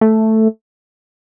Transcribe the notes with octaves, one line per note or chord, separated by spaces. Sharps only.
A3